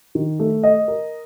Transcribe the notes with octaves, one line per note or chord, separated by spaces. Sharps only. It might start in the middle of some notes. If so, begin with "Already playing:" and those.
D#3
A3
D#5
A#4